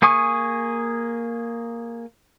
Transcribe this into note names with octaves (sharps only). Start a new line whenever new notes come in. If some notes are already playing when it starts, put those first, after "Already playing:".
A#3 G#4 G#5 C#6 D#6